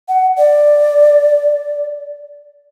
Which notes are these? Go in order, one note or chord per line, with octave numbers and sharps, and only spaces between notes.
F#5
D5